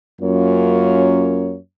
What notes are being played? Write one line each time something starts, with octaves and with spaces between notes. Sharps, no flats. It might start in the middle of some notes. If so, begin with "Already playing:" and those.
F#2 A#3 C#4 F4 C#5